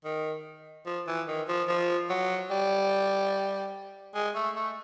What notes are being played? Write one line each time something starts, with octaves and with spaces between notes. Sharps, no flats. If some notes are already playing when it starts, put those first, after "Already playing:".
D#3
F3
E3
D#3
F3
F3
F#3
G3
G#3
A3
A3